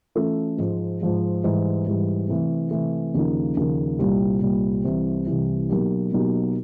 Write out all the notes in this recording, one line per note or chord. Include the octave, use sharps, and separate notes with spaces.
E3 A3 C#4 F4 A4
G#2 F3 G#3
G#2 F3 G#3
G#2 E3 G3
G#2 E3 G3
C3 E3 A3
C3 E3 A3
D#2 C#3 F3 A#3 D#4
D#2 C#3 F3 A#3 D#4
C2 A#2 G3
C2 A#2 G3
C2 C3 E3
C2 C3 E3
B2 F#3 A#3 D#4 G4
B2 F#3 A#3 D#4 G4